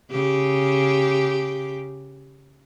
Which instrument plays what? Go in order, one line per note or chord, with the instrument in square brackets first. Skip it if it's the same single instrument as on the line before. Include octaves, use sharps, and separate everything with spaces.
[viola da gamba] C#3 G4